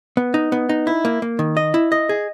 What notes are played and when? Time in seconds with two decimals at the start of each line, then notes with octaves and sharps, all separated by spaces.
0.17 B3
0.34 D#4
0.52 B3
0.69 D#4
0.87 E4
1.05 A#3
1.22 A#3
1.39 D#3
1.57 D#5
1.74 E4
1.92 D#5
2.09 G#4